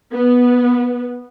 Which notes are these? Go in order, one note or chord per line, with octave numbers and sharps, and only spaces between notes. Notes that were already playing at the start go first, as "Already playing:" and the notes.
B3